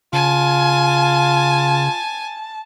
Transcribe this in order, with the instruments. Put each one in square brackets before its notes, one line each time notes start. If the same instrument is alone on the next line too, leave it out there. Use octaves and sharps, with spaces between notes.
[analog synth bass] C#3 [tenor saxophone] F4 [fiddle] G#5 [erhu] A5